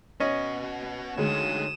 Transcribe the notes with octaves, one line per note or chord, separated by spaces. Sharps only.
B3 C#4 F#4 D#5
D2 G#3 D#4 C#5 D#6 E7